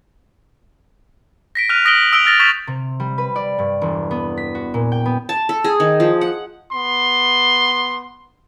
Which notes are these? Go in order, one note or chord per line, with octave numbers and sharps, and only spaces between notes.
A#6 B6 D7
F6 F#6 D#7 F7
D#6 A#6 B6 D7 F#7 G7
D#6 E6 D7 F7 G7
E6 F6 A6 A#6 D7 F7
C#6 G6 A6 B6 F7
C3
G3
B4
D5
G2
E1
B3
B6
F#4
A#2
G5
B3
A5
A4
G#4
D#3
F3
F#5
B3 C6